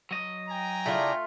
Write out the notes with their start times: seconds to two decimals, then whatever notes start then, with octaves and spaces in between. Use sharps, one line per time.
0.11 F#3 D#5
0.49 G5 G#5 A#5
0.86 C#3 A3 D4 E4 F4